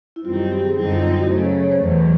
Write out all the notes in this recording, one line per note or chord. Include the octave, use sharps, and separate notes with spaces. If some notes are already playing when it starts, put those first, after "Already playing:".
E4
F#2 D#3 G3 C4 D#4 F4
G4
F#4
G4
G#4
F#2 D3 G3 C4 D#4 E4
F4
E4
F#4
C#3 F#3 A3 C5
C#5
C#5
C5
E2 B2 F#3